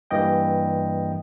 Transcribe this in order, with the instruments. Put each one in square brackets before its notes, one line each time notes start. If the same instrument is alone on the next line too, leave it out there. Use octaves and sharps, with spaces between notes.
[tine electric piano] G2 E3 A#3 D#5 G5